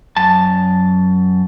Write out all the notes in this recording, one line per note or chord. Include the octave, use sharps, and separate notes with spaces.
F#2 A5